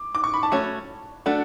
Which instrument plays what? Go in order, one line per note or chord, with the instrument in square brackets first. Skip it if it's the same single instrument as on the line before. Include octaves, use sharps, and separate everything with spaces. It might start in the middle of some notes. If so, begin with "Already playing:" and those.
Already playing: [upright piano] D6
D6
C#6
B5
A5
[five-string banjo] A3 C#4 F#4 C#5
[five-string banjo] A3 D4 F#4 [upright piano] F#5